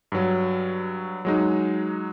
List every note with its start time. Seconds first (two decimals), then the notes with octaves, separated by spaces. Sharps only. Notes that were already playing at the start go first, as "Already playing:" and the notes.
0.12 G2 F#3
1.25 F#3 G#3 D#4